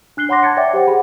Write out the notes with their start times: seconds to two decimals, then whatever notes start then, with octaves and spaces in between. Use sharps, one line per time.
0.17 D4 F#6 C7 G7
0.29 C#5 F#5 B5 C6 D6 A#6
0.43 A5 G#6 A6 C#7
0.57 C#5 D5 E5 G5 D6
0.74 G4 C5 F#5 G5
0.88 G#4 F#5 B5